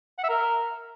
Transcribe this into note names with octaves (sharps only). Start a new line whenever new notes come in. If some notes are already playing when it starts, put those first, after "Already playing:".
F#5
E5
A#4